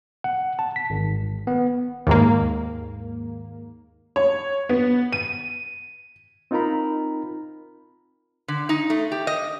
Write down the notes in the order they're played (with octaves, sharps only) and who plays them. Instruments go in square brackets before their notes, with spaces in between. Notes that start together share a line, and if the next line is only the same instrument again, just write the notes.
[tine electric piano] F#5
A5
B6
G#1
B3
[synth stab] D#2 G#2 A#3
[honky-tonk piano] C#5
B3
D#7
[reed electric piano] C4 D#4 F4 A#4 A#5 B5
[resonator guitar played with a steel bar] D3
D#4
A3
G4
D#5